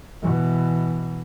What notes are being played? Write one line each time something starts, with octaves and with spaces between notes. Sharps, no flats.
B2 E3